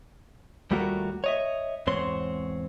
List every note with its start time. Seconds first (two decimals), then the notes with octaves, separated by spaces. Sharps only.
0.71 D#2 G3 A3 F4 F#4 A#4
1.24 C#5 D#5 E5
1.87 E2 G#2 C4 C#5 C6